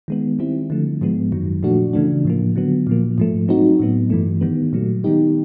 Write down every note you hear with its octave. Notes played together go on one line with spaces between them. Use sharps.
D#3 G#3 B3
D#3 G3 C4 E4
D3 F3 A3
G#2 F3 G#3 B3
F#2 D#3 F#3
A#2 F3 A3 D4 F#4
C#3 E3 A3 D4
A2 F3 A#3
D3 F#3 B3
A#2 F3 A#3
G#2 F3 A3
F#3 A3 C4 D#4 F#4
A2 F#3 B3
G2 E3 A3
D#3 G3 B3
A#2 F#3 A3
D#3 G3 B3 D#4 G4